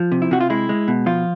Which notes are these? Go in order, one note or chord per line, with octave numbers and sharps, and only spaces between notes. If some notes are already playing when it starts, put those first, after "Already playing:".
Already playing: F3
C3
E4
C3 F#4
F4
G#3 E4
G#3
B2
F3 F4